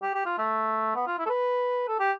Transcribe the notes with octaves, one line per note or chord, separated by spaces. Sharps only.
G4
G4
F4
A3
B3
F4
E4
A4
B4
A4
G4